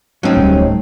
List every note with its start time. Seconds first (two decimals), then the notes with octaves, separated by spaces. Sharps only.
0.23 F#3 A3 C4 C#4 D#4
0.37 D1 G3